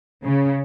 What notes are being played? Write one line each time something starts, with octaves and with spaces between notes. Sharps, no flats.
C#3